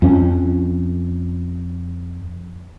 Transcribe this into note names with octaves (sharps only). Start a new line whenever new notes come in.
F2 C#4